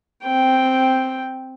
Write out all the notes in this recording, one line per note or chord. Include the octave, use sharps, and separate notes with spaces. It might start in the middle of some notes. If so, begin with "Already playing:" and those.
C4 G5